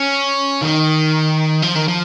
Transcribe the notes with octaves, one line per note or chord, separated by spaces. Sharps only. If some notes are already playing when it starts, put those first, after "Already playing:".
Already playing: C#4
D#3
F3
D#3
F3